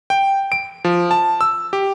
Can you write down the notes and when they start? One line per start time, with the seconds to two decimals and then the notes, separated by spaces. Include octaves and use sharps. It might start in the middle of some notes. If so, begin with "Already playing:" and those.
0.10 G5
0.52 D7
0.85 F3
1.11 A5
1.41 E6
1.73 G4